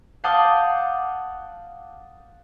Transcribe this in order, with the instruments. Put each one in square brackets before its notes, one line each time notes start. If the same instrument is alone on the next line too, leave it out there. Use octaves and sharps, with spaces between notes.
[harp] F5 F#5 A5 D6 D#6 G6